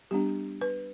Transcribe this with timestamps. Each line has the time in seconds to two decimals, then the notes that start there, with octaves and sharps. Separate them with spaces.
0.11 G3 B3 D4 G4
0.61 B4